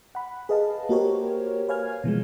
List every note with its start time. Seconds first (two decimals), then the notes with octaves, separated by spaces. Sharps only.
0.15 F#5 B5
0.49 G#4 B4 D#5 F5 A5
0.89 A#3 F#4 G4 A#4 C5 C#5
1.68 B4 C#5 F5 G#5 F6 G#6
2.04 B2 E3 F3 G#3